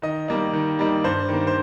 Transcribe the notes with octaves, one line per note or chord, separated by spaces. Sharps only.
D#3 D#5
G3 A#3 D#4
D#3
G3 A#3 D#4
G2 C5
D#3 A#3
C5